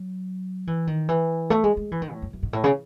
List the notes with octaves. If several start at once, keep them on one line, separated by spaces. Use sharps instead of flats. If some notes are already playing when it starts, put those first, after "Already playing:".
Already playing: F#3
E3
D#3
E3
A3
G#3
G#3
E3
D#3
A2
F#2
F#2
G#2
A2
C#3